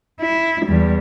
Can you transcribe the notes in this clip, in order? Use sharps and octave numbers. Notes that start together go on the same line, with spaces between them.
E4
E2 G3